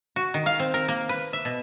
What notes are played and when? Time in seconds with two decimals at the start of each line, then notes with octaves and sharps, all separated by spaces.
0.16 F#4
0.34 D#3
0.46 F5
0.59 C4
0.74 A#4
0.88 A#3
1.09 B4
1.33 E5
1.45 B2